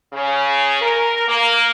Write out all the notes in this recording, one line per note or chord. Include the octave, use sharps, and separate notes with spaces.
C#3
A#4
A#3